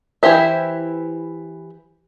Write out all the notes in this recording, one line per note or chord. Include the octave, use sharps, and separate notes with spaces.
E3 E4 G4 C5 E5